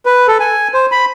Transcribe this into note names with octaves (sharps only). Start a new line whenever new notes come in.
B4
A4
G#5
C5
B5